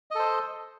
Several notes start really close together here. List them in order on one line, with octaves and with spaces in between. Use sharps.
D#5 A4 C5